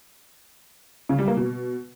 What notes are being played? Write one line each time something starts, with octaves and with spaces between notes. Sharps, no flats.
C#3
G3
A#3
B2